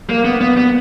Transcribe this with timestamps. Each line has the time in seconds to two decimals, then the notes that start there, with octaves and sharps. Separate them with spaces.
0.10 A#3
0.25 B3
0.41 B3
0.57 B3